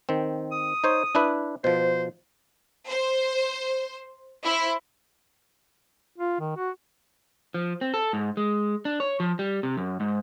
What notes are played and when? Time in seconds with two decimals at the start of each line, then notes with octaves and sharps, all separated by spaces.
0.09 D#3 C4
0.52 D#6
0.84 D#4 C5 C#5
1.15 D4 E4 B4
1.64 B2 F3 C5
2.89 C5
4.43 E4 C5
6.18 F4
6.40 D#3
6.57 F#4
7.54 F3
7.81 C4
7.94 A4
8.13 G#2
8.37 G#3
8.85 D4
9.00 C#5
9.20 F3
9.39 G3
9.63 C3
9.77 F#2
10.00 G#2